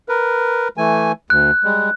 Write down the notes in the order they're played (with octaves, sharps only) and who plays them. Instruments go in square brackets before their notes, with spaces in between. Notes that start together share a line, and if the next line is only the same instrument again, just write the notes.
[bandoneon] A#4 B4
E3 A3 G#5
[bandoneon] D2 [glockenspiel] F#6
[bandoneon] G3 G#3